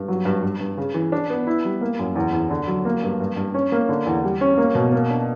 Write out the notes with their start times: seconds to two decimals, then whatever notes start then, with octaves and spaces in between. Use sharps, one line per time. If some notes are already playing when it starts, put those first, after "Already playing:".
Already playing: G2
0.08 F#3
0.25 G2
0.42 G2
0.60 G2
0.77 C#3
0.94 E3
1.12 D4
1.30 B3
1.47 E4
1.65 G3
1.81 A#3
1.99 F#2
2.16 E2
2.33 E2
2.50 D3
2.67 F#3
2.85 A#3
3.03 G2
3.20 G2
3.36 G2
3.54 C#4
3.72 A#3
3.89 D3
4.06 E2
4.24 G3
4.41 C#4
4.58 A#3
4.75 B2
4.92 A#3
5.10 D4